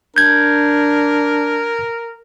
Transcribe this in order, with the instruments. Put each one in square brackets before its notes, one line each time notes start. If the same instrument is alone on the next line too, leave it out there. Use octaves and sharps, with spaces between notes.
[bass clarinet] D4 [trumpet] A#4 [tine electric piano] G6 G#6